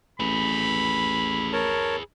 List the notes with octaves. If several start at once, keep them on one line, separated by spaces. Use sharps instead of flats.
A1 G#4 B4 B5
A#4 C#5 A5